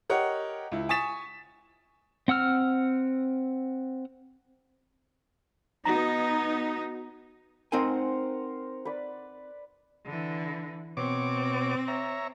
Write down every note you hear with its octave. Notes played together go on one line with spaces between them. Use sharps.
G4 A#4 C#5 D#5 F#5
C#2 E4
G#5 C#6 D#6 A6 B6 E7
C4 F#5 E6 F6
B3 D#4 F#4 A#5
C4 D#4 A#4 C5 F#5 G#5
B4 D5
D3 E3
B2 C4 C#5 D6
C#5 E5 A#5